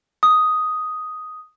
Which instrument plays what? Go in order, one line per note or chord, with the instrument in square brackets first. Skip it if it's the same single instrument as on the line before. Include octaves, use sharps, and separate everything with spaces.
[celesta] D#6